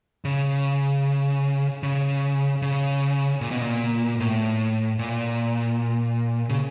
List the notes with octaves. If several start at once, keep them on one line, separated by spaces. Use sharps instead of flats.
C#3
C#3
C#3
A#2
B2
A#2
A2
A#2
C#3